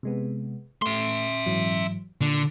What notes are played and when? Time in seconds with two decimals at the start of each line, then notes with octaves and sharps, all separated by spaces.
0.03 C3 G#3 B3
0.82 A3 E5 C6
1.46 G#2 E3 F#3
2.21 A#2 D3